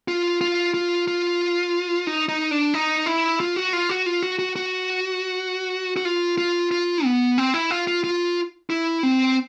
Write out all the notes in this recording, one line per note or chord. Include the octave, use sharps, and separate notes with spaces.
F4
F4
F4
F4
D#4
D#4
D4
D#4
E4
F4
F#4
F4
F#4
F4
F#4
F#4
F#4
F#4
F4
F4
F4
B3
C4
E4
F4
F4
F4
E4
C4